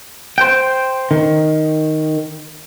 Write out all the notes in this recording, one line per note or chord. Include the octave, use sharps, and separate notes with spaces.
C5 G5
D#3